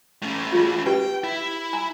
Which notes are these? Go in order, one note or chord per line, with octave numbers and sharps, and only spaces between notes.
A2 C#4
F4 G#4
G4 B4 G5
E4
G#5 A#5